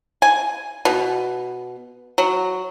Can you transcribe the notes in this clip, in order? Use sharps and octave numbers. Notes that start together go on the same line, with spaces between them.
G#5
B2
F#3